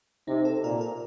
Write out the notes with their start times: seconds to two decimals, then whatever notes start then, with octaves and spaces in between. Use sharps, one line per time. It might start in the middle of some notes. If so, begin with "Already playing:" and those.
0.28 C3 D#4
0.45 A4
0.64 A#2 A#4
0.81 A#4